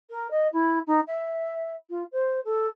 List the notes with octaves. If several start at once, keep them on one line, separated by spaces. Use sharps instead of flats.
A#4
D#5
E4
D#4
E5
F4
C5
A4